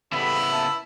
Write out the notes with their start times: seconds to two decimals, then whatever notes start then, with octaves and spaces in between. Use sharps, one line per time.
0.12 C#3 G3 B3 E4 A4 B5
0.51 A#3 E5 A5